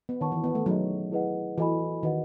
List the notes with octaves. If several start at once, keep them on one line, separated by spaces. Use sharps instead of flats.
B3
D#3 C#5 F#5 A5 C#6
E3
B3
A3
F#3 D#4 G#4 D#5
E4 G#4 B4 D#5 F#5
E3 F#4 A4 D#5 G#5 B5
D#3 F#4 B4 D#5 F#5